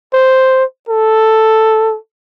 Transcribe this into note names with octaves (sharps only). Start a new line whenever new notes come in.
C5
A4